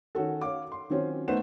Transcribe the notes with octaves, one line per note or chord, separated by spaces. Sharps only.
D#3 C#4 F#4 A4
C#5 F5 D6
C6
D#3 F#3 C4 C#4 F4
A3 B3 D#4 B4 C5 E7